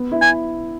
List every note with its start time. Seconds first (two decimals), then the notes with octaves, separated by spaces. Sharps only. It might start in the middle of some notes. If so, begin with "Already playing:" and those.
Already playing: B3
0.12 E4
0.21 G#5